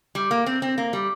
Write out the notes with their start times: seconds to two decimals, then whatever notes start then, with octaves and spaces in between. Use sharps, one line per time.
0.15 G3
0.31 A#3
0.46 C4
0.62 C4
0.78 A#3
0.93 G3